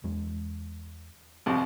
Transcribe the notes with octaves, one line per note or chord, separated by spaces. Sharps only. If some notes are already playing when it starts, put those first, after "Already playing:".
E2 G#3
C2 F2 C3